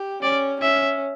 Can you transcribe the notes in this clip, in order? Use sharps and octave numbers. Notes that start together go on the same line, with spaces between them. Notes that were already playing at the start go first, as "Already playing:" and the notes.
Already playing: G4
C#4 D5
C#4 E5